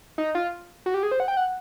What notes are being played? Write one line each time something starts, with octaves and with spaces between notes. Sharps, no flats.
D#4
F4
F#4
G4
G#4
C5
F#5
G5
F#5